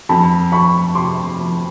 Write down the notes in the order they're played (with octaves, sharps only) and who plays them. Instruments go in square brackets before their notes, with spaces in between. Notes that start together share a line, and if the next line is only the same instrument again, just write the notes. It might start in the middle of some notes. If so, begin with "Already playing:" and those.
[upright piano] F2 A5 B5
F2 B5 C#6
C3 C6 D6
F3